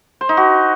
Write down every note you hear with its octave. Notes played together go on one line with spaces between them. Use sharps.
C5
D#4
F#4